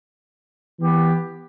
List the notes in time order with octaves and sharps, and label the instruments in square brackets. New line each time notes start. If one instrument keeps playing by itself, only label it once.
[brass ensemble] E3 B3 G4